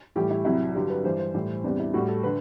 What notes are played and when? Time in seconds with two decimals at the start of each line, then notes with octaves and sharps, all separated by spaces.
0.16 A2 E3 G3 G4
0.31 E4
0.45 C2 C3 F#3 E4
0.75 G2 D3 F#3 G4
0.90 B4
1.04 G2 E3 G3 C5
1.19 C5
1.34 A2 E3 G3
1.64 E2 C3 G3 D4
1.80 E4
1.94 A2 G3 F#4
2.08 A4
2.23 D3 B4